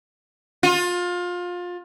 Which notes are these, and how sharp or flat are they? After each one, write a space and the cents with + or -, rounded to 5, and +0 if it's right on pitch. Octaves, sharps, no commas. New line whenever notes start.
F4 +25